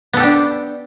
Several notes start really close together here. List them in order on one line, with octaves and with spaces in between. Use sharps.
B3 A4 G4 D4